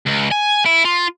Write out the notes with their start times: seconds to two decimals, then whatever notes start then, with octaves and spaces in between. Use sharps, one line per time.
0.06 C#2
0.32 G#5
0.66 E4
0.85 F4